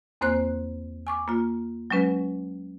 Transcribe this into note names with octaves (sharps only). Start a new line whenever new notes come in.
E2 A#3 C4 C5 F#6
G#5 C#6 D6
A#3 F4
F#3 G#3 C#4 B4